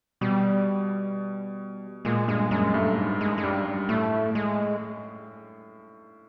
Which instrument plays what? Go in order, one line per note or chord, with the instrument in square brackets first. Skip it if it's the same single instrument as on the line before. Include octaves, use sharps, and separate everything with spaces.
[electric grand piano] B2 [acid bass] G3
[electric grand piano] A#2 [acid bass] G#3
[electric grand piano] G2 [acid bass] G#3
[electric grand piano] F#2 [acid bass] G#3
[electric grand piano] G2 [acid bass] A3
[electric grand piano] G#2
[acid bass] G#3
G#3
[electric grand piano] G2 [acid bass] G3
[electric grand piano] A2 [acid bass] A3
[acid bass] G#3